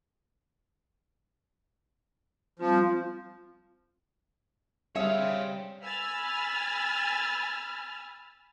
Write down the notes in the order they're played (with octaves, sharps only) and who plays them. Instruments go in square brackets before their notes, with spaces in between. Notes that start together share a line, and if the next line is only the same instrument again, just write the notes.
[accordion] F3 [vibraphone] G3 C4 F4
[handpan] G3 C4 C5 [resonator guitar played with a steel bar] G#4 E5 [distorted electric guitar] C#5 F5
[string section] G#5 B5 E6 F6 A6